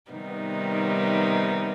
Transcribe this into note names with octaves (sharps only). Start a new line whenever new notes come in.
C3 D#3 G3 B3 D#4